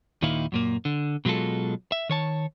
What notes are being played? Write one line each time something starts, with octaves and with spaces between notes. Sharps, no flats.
D#2 A#2 D#3 D#4 E4 F5
F#2 A#2 A#3
D3
B2 F#3 G#3 F4 A4
E5
D#3 C#5 A5